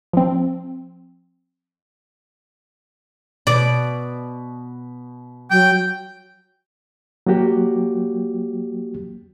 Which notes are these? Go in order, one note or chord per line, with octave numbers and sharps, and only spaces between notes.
F3 C4
B2 D5
F#3 G5
F#3 A#3 F#4 G4